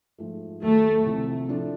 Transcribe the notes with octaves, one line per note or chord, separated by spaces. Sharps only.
G#2 F3 A3
D#2 D#3 F#3 A3
C2 C3 F3
A2 F3 A3 D4